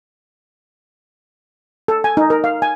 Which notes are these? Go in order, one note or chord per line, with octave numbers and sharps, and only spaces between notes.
A4
G#5
D#4
A#4
F5
G#5